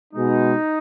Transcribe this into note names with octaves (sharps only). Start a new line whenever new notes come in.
B2 G#3 D#4